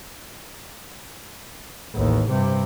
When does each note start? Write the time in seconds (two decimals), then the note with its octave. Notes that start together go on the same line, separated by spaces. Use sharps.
1.93 A1 D#2
2.29 G2 C3